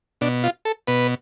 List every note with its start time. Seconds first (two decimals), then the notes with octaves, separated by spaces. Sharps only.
0.21 B2 D4
0.44 F4
0.65 A4
0.87 B2 B4